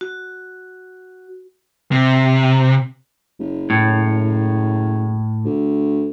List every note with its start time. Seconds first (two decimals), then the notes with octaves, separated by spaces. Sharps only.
0.01 F#4
1.91 C3
3.40 F#1
3.70 A2
5.45 D2